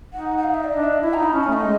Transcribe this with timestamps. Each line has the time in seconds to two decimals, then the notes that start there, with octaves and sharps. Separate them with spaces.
0.14 D#4 F#5
0.38 F#5
0.44 F5
0.54 E5
0.64 D5
0.73 D4 D#5
0.84 E5
0.93 D#5
1.03 E4 E5
1.14 A#5
1.18 D#4 B5
1.33 C#4 A5
1.44 G#5
1.48 A3
1.53 D#5
1.63 G#3